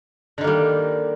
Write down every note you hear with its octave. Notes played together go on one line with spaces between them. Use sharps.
D3 D#3 G3 A#3